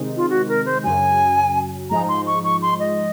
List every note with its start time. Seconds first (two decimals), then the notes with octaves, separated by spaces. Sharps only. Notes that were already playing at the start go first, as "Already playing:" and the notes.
Already playing: C3 D#3 G#3 C4 D#4
0.17 F4
0.30 F#4
0.49 A#4
0.66 C5
0.84 F#2 C#3 F#3 G#5
1.90 G#2 F3 G#3 D#4 A#5
2.09 C6
2.27 C#6
2.44 C#6
2.62 C6
2.80 D#5